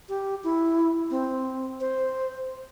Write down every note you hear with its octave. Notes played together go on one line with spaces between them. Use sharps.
G4
E4
C4
C5